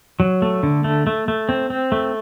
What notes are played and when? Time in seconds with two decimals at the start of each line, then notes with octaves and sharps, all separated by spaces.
0.20 F#3
0.42 A3
0.63 D3
0.84 A3
1.07 A3
1.28 A3
1.49 C4
1.70 C4
1.92 A3